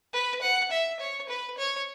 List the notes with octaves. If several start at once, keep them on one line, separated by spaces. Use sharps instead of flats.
B4
F#5
E5
C#5
B4
C#5